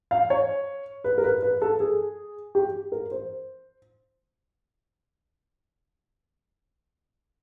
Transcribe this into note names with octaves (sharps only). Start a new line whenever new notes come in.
F5
C#5
B4
A#4
B4
B4
A4
G#4
G4
A#4
C5